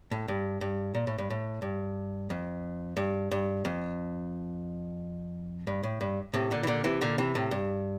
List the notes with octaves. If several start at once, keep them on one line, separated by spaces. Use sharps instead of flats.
A2
G2
G2
A#2
A2
G2
A2
G2
F2
G2
G2
F2
G2
A2
G2
A2 C3
A#2 D3
E3
A#2 D3
C3 E3
A#2 D3
C3 E3
A2 C3
G2